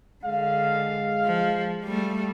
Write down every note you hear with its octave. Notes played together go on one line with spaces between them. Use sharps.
D3 G#3 F5
F3
G3 A3